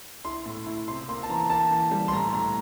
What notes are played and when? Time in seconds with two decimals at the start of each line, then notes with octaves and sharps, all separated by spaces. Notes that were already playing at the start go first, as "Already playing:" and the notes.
0.25 E4 C6
0.46 A2
0.67 E4
0.88 C3 C6
1.08 A#3 C6
1.23 A5
1.29 E3 A#5
1.50 A#3 A5
1.71 E3
1.91 G3
2.08 C6
2.12 A2 A#5
2.33 A2 A#5